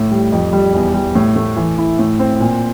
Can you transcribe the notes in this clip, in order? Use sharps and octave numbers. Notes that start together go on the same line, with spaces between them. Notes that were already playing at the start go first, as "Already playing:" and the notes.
Already playing: A2
G3
F2
G3
E2
G3
A2
A3
E3
E4
A2
C4
A#2